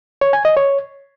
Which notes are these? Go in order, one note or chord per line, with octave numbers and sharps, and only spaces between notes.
C#5
G#5
D#5
C#5